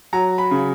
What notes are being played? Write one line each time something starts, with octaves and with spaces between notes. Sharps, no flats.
F#3 A#5
B5
C#3